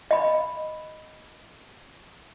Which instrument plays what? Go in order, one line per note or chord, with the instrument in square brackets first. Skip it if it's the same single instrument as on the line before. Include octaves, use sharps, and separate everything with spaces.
[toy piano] D#5 B5